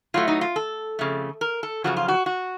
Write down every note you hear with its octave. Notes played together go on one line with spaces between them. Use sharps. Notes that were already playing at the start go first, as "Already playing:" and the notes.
A2 F#3 A3 F4
D#4
F4
A4
F2 C#3 A3
A#4
A4
F#2 C#3 F3 F#4
F4
F#4
F#4